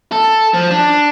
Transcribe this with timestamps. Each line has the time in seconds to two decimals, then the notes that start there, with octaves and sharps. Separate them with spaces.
0.12 A4
0.54 F3
0.71 D4